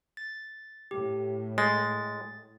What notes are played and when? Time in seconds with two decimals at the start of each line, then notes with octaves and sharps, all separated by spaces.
0.17 A6
0.91 A2 G4
1.58 G#3 A6